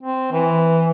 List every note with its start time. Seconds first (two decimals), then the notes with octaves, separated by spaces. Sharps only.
0.03 C4
0.32 E3